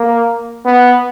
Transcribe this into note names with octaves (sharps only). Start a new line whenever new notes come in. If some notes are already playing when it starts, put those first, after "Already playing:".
Already playing: A#3
B3